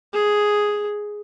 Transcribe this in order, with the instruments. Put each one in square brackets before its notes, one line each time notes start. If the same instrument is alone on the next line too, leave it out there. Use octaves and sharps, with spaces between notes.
[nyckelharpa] G#4